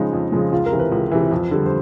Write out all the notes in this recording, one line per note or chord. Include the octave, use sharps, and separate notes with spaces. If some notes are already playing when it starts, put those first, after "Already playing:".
Already playing: C#3 F3 G#3 D#4
F2
C#3 F3 G#3
C#2 F4
A#4
C3 E3
B4
C#2
C3 E3
F2
D3 G3
C5